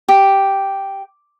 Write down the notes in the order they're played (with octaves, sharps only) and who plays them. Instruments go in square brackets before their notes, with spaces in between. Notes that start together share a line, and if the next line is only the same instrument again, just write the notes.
[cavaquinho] G4